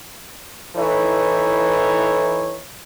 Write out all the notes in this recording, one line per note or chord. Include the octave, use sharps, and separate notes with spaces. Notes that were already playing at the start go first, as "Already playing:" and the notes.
E3 D#4 E4 A4 B4 C#5